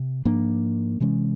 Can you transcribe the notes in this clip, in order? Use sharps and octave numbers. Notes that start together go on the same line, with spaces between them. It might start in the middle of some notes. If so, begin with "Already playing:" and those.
Already playing: C3
G#2 F3 A#3 D4
C3 E3 G#3 C#4